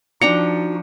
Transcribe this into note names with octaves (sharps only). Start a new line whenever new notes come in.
F3 D4 D#4 F#4 G5 A#5 C#7